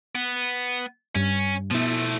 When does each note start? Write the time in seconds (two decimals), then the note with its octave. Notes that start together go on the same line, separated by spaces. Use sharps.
0.15 B3
1.15 G2 C#4
1.71 B2 F3 A3 E4